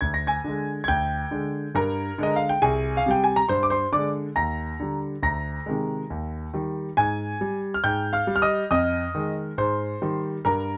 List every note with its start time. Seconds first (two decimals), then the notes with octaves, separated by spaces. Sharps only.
0.01 D2 G#6
0.14 A#6
0.27 G#5 G#6
0.44 D3 G#3
0.84 G#6
0.88 D2 G5 G6
1.31 D3 G#3
1.75 G2 A#4 A#5
2.18 D3 G#3 D#5
2.36 F5
2.49 G5
2.62 C2 G#4 G#5
2.97 F5
3.06 C3 G3 G5
3.24 G#5
3.36 A#5
3.49 G2 C5 C6
3.63 D6
3.70 C5 C6
3.92 D3 G#3 D5 D6
4.36 D#2 A#5 A#6
4.80 D3 G3
5.23 D2 A#5 A#6
5.66 C3 D#3 G#3
6.10 D#2
6.54 D#3 G3
6.97 G#2 G#5 G#6
7.41 G3
7.74 F6
7.84 G#2 G5 G6
8.13 F5 F6
8.27 G3
8.36 F6
8.42 D#5 D#6
8.71 F2 D#5 D#6
9.15 D#3 G#3
9.58 G#2 C5 C6
10.02 D#3 G3
10.45 G2 A#4 A#5